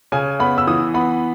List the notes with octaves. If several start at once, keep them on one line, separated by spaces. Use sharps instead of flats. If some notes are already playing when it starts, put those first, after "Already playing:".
C#3 G#5
B3 B5
E6
E3 D#6
B3 B5